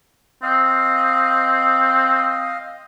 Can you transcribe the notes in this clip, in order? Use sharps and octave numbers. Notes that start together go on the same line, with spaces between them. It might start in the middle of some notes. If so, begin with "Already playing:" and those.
C4 D#5 F5